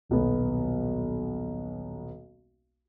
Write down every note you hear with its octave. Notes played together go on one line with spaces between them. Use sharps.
D#1 B1 B3